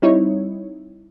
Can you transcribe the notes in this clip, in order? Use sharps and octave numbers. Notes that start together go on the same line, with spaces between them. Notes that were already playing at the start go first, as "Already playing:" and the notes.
G3 C4 D#4 E4 C#5